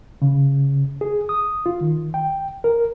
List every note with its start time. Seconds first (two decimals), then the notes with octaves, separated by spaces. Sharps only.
0.22 C#3
1.01 G#4
1.29 D#6
1.66 F4
1.81 D#3
2.14 G5
2.64 A#4